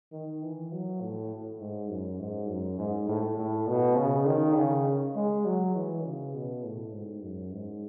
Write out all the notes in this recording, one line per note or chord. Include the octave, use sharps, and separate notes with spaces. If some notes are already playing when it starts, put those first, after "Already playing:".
D#3
E3
F#3
A2
G#2
F#2
G#2
F#2
G#2
A2
A2
B2
C#3
D#3
C#3
G#3
F#3
E3
C#3
B2
A2
G#2
F#2
G#2